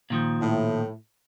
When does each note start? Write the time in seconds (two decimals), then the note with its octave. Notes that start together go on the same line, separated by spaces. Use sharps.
0.10 A#2 D#3 F3
0.41 A2